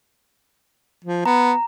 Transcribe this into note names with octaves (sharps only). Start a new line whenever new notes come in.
F3
B3 A#5